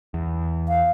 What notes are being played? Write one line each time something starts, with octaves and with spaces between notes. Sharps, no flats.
E2
F5